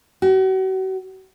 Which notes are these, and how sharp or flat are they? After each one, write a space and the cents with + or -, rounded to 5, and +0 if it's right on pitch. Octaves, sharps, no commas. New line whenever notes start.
F#4 +40